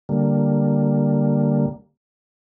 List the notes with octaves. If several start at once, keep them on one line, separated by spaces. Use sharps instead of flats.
D3 G3 A#3